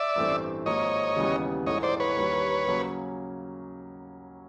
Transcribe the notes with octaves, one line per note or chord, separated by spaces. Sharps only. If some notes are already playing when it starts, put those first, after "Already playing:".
Already playing: D5 E5
A1 G2 E3 A3 C4
G#1 G#2 F3 A#3 C#5 D#5
D#2 C#3 E3 G3 B3
A#1 G#2 E3 A3 C#5 D#5
C5 D5
B4 C#5
D#2 D#3 G3 A#3
C#3 F#3 A#3 C#4